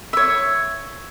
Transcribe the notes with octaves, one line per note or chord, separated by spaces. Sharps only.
C#5 E5